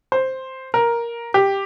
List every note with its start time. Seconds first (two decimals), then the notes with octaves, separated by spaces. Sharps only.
0.12 C5
0.74 A#4
1.34 G4